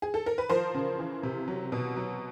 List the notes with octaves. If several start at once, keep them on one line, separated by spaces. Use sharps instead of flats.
G#4
A4
A#4
B4
F3 A#4 C5
C#3
E3
C3
F#3
B2
F#3